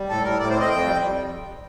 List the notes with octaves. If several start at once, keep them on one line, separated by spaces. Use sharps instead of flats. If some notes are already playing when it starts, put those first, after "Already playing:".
Already playing: G3
A2 A4
A2 A#4
A2 D5
C5
C4
D#5
F2 G5
G3